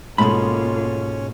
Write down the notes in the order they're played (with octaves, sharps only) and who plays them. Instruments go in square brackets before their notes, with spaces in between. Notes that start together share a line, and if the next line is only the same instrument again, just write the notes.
[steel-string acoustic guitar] G#2 B2 G#3 [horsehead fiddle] A#3 F4 [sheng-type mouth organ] C#4 [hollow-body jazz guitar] A4 B5